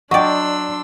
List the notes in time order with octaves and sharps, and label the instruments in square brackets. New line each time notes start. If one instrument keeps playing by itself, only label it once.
[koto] F#3 D5 [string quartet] D4 C6 E6 [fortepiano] D#5 G5 [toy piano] C#6